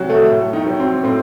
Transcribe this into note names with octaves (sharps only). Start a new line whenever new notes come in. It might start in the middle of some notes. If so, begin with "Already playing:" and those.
Already playing: C2 F#3 C4 F#4
A3 A4
A2
D#3 D#4
F#3
C4
A2 C4